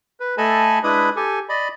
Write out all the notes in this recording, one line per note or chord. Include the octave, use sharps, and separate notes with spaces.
B4
A3 A4 D#5 G#5 A5 B5
G#3 D4 E4 B4 B5 D#6
G4 A4 G#5
D5 D#5 B5